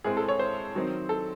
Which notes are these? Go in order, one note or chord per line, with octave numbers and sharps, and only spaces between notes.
A2 G#3 C4 G#4
A4
C#5
C5
D#3 F#3 C4 D#4
A4